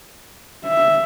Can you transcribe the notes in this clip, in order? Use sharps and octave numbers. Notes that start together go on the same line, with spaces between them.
E5